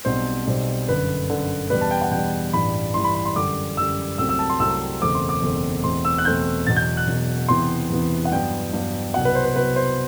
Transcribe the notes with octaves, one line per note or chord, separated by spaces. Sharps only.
B1 B2 G3 C4 C5
B1 B2 G3 C4
G1 F#2 D3 B4
G1 F#2 D3
E2 B2 G3 B4
A5
G5
F#5
E2 B2 G3 G5
A1 G2 E3 G3 B5
A1 G2 E3 G3 C6
B5
B5
C6
F#2 D3 G3 D6
F#2 D3 G3 E6
C2 C3 F#3 A3 C4 E6
E6
A5
C6
C2 C3 F#3 A3 C4 E6
F#1 E2 B2 A3 C4 D6
C6
D6
F#1 E2 B2 A3 C4
E2 B2 A3 C4 C6
E6
F#6
E2 B2 A3 C4 G6
E1 E2 B2 F#3 A6
G6
F#6
E1 E2 B2 F#3
E2 C3 E3 B3 C6
E2 C3 E3 B3
F#5
G2 F#3 B3 G5
G2 F#3 B3
C2 B2 F#3 F#5
B4
C5
B4
C2 B2 F#3 B4
C5